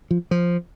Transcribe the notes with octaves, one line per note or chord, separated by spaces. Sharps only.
F3
F3